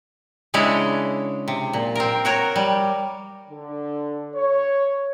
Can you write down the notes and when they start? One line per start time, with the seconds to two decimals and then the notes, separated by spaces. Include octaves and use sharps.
0.54 C#3 G#3 D4 E4 C#5
1.48 C3
1.73 A#2
1.95 C4 A#4
2.25 F#4 A#4 C#5
2.56 G3
3.50 D3
4.34 C#5